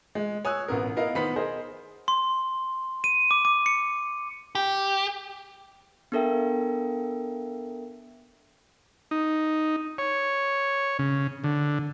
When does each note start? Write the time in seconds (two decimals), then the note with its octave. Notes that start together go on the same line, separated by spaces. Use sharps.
0.15 G#3
0.45 C#5 G#5 D#6 E6 F#6
0.68 A1 B3 A#4
0.96 B3 E4 A#4 D#5 F5
1.15 D#3 B3 C5 F#5 B5 B6
1.36 G#4 A#4 C5 D#5
2.08 C6
3.04 D#7
3.31 D6
3.45 D6
3.66 C#7
4.55 G4
6.12 B3 D4 A4 A#4 E5 G5
9.11 D#4
9.98 C#5
10.99 C#3
11.44 D3